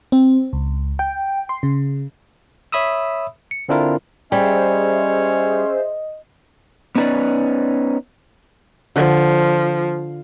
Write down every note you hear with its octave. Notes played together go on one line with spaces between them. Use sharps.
C4
C#2
G5
C6
C#3
C#5 E5 B5 D#6 E6
C#7
D3 C4 D4 E4 F4 A#4
G3 C#4 G#4 C5 D#5 E5
B3 C#4 D#4 A4 B4 D5
D3 F3